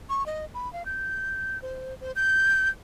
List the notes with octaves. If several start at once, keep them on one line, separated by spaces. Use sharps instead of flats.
C#6
D#5
B5
F5
G6
C5
C5
G6